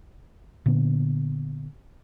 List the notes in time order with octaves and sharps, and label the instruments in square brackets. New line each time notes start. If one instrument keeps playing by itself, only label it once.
[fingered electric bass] A#2 D3 B3